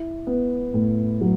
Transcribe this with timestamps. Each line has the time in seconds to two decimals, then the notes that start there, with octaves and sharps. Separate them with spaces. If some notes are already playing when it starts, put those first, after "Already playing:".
Already playing: E4
0.27 B3
0.74 A2
1.21 F#3